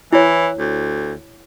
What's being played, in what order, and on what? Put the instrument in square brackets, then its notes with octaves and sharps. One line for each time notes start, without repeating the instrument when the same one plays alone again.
[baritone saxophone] E3 [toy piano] E4 C#5
[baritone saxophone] D2